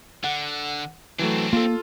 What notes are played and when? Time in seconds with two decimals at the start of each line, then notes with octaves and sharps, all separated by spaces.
0.24 D3 F#5
1.19 E3 F#3 A3 C4 D4
1.53 A#3 F4 A4